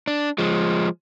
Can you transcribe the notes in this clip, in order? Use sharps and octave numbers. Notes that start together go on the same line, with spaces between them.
D4
F3 G#3